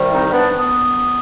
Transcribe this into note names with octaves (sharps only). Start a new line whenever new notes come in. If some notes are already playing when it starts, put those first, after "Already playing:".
Already playing: C2 C3 D#3 G3
C4 D#4
B3 D4
B3